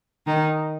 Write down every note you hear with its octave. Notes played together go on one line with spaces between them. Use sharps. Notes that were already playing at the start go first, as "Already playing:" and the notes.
D#3 D#4